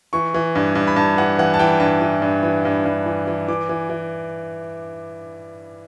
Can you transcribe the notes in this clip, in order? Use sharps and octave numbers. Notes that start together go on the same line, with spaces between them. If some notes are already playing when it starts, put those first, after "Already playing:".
E3 C#6
E3
G2
G2
B5
G2 A5
E3 F#5
E3 F#5
A5
E3 G5
G2 A5
E3
G2
E3
G2
G2
E3
E3
E3 D6
E3
E3